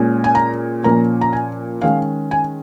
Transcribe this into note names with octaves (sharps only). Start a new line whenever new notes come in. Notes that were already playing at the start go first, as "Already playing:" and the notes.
Already playing: A#2 G#3 C#4
G#5
A#5
A#2 F3 A#3 C#4 A#5
A#5
G#5
D#3 G#3 C#4 F5
G#5